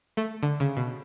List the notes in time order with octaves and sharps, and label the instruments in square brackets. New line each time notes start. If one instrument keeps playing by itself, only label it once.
[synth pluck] A3
D3
C#3
B2